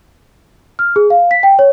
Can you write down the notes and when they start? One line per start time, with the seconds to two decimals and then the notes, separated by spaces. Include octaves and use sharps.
0.79 F6
0.96 G#4
1.10 F5
1.31 B6
1.43 G5
1.59 C#5